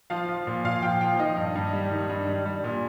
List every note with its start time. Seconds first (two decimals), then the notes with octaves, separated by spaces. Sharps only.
0.10 F3 F5
0.29 F3
0.47 A#2
0.64 A#2 F5
0.82 F3 G5
1.01 F3 G5
1.19 D#3 D#5
1.37 G2
1.55 G2
1.73 G3
1.92 D#3
2.09 G2
2.27 G3
2.45 G3
2.64 A#2